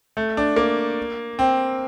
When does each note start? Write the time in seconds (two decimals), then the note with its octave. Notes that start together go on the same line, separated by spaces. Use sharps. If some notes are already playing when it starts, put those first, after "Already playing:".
0.17 A3
0.37 D4
0.56 A#3
1.39 C4